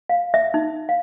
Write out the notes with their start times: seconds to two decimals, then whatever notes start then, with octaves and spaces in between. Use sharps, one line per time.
0.09 F5
0.34 E5
0.54 D#4
0.89 F5